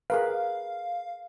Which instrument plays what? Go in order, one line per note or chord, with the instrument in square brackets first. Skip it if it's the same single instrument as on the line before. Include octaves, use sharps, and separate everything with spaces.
[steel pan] G#4 A#4 B4 [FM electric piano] F5